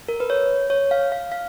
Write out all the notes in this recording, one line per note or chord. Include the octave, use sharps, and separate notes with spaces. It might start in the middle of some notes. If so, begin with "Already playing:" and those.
A#4
B4
C#5
C#5
F5
F5
F5